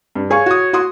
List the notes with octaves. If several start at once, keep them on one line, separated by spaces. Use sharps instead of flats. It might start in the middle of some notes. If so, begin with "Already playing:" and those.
G2
G#4 C#5 F5 C#6
F#4 D#6
F#4 C6 D#6